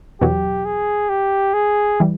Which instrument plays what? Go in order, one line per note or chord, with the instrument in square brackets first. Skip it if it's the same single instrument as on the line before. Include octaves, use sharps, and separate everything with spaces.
[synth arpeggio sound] E2 B2 F#3 [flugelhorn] G4
[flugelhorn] G#4
G4
G#4
[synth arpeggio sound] E3 G3